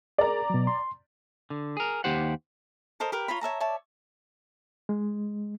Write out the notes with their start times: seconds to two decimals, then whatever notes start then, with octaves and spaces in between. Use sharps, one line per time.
0.18 G#4 A#4 D5 A#5
0.50 B2 F#3
0.67 C6
1.50 D3
1.77 G#4 A#4
2.04 D#2 G4 C5 F#5
3.00 A4 A#4 C5 D#5
3.12 G4 A#4 B4
3.28 F4 C#5 A#5 B5
3.41 C#5 E5 A5 A#5
3.60 C#5 D5 E5 A5
4.89 G#3